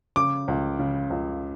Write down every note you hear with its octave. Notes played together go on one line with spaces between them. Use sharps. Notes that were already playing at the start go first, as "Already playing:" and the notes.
C#3 D6
C#2
C#3
C#2